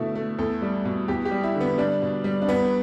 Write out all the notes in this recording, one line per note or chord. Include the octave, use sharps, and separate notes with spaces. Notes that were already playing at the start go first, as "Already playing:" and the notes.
Already playing: B2 D3 A3 E4
A3
E2 A4
G3
B2
E2 G4
G4
G3
E4
D3
B3
G3 D4
B2
G3
D4
E2 B3